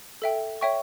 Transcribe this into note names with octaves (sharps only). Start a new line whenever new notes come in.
A4 E5 G5
C#5 E5 G5 C#6